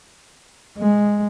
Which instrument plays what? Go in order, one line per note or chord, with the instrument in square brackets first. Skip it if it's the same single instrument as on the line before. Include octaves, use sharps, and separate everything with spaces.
[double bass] G#3